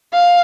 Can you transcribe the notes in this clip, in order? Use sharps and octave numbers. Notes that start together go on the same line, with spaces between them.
F5